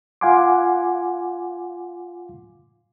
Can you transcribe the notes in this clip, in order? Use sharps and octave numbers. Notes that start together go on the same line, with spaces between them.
F4 F5 F#5 G#5 C6 D6